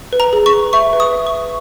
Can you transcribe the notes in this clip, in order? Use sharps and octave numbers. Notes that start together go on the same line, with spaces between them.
B4
A#5
G#4
C#6
B4
E5 C#6
B4
D#6
E5
C#6
E5